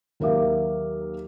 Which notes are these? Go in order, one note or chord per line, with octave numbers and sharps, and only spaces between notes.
D#2 F#3 A#4 E5 F5 D6